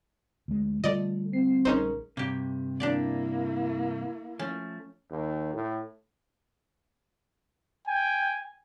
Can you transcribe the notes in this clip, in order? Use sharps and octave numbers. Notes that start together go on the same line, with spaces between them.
D2 G#3
D3 G3 A3 F4 A4 D5 D#5
C4 C7
A#1 C#4 D#4 G#4 A#4 C5
G2 C3 A#3 G4
A#3 D4 E4 G4 D5
F3 A3 C#4
D#2
A2
G5 G#5